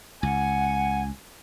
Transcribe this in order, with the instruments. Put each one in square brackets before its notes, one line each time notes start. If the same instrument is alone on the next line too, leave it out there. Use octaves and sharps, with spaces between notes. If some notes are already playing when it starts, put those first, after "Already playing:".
[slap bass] C#2 [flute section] F#5 [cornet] G#5